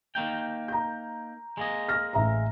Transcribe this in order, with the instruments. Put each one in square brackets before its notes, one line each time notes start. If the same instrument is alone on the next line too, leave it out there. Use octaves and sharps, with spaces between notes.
[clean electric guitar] A#3 D#4 G5
[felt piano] A#5 G6
[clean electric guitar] G#3 A#3 D#5
[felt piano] F6 A#6
A1 E5 A#5